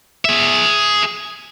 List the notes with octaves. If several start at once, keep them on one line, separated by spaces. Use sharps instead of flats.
G#4 E5